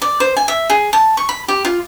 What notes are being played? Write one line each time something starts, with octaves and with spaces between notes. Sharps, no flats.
D5
C5
G#5
E5
G#4
A5
C#6
B5
G4
F4